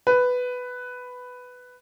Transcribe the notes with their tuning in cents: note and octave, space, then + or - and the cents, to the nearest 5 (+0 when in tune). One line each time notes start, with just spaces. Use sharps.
B4 +5